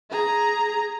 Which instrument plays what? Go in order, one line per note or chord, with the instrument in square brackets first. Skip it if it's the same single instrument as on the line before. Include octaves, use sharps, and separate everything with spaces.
[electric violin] G#4 A#5